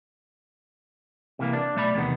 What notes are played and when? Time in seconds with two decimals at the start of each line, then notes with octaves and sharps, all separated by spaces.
1.39 C3 E3 A#3
1.53 D4
1.75 B1 A3 D5 B5
1.94 E2 C3 D#3 B3